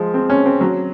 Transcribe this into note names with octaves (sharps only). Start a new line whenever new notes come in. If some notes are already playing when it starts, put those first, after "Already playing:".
Already playing: F3 G#3
C4
C#4
C4
F#3